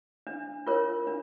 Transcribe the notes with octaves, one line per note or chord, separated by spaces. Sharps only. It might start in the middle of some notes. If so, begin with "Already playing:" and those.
D4
F4 A#4 C#5
D4